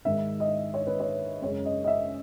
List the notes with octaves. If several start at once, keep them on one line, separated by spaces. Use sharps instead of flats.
G#2 D#3 G#3 E5
D#5
C#5
B4
C#5
F#2 C#3 G#3 C#5
D#5
D#5
E5